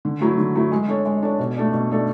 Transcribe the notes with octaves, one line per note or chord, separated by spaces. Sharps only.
D3
F#3 A3 E4
D3
F#3 A3 E4
G#3
D4 A4 C#5
G#3
D4 A4 C#5
B2
A3 D4 A4 D5
B2
A3 D4 A4 D5